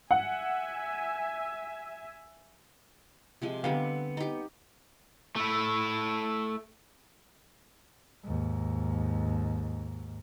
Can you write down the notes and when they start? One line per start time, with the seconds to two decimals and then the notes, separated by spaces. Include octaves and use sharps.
0.11 E5 F#5 G#5
3.42 C3 F3 G#3
3.64 D3 G3 B3 C4 F5
4.17 D#4 G4
5.36 A3 E4
8.24 D#2 G#2